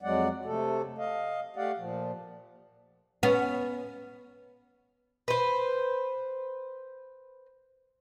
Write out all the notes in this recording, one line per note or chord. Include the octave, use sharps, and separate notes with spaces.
F2 F#3 G#3 D5 F#5
C3 A3 A4
D#5 F5
A3 G4 D5 F5 F#5
A#2 F3
B3 C#4
B4 C5